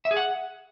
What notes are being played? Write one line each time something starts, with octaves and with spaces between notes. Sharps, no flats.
E5
G#4
F#5